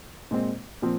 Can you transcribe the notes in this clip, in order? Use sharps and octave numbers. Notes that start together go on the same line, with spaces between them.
A#2 G#3 C4
A#2 F3 C4